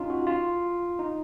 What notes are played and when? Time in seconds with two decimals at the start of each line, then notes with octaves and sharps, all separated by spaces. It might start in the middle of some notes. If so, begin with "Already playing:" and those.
Already playing: C#4 D#4 F4
0.10 F#4
0.27 F4
0.99 D#4